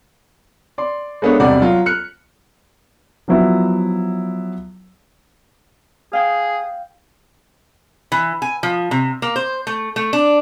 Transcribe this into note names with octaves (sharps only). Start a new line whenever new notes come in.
D5 C6
G#3 A#3 B3 D4 A4 C#5
E1 A1 C3 G3 D5 F#5
F#3 F4
F6 F#6 C#7
F3 F#3 B3 E4
G#4 F5 G5
E3
G#5
F3
C3
A#3
C5
A3
A3
D4